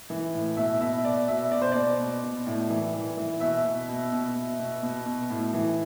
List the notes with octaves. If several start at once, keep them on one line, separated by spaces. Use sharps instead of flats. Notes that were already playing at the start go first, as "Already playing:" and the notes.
E3
A2
B2 E5
B2 E5
B2 D5
B2 E5
B2 D5
C5
B2 D5
B2
B2
A2
E3
E3
E3
B2 E5
B2
B2
B2
B2
B2
B2
B2
A2
E3